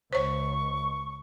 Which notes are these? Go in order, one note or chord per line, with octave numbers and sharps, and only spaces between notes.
C#2 C5 C#5 C#6